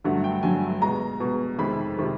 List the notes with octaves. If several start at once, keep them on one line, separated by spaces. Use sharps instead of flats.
G2 D3 F#3 A3 F#5
G5
G2 D3 F#3 A3 G#5
B2 G#3 A#5
B2 G#3
F2 C3 D#3 G#3 B5
C3 D#3 G#3